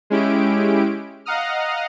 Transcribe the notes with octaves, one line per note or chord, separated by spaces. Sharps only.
G#3 C#4 E4 G4 D7
D#5 F5 F#5 A#5 D#6 F6